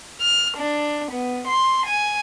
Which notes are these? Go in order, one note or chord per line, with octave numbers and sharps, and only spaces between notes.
F6
D4
B3
C6
G#5